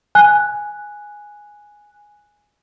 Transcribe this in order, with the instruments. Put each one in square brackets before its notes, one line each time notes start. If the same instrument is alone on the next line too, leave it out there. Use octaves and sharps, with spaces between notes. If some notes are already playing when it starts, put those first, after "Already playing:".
[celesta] G#5 F#6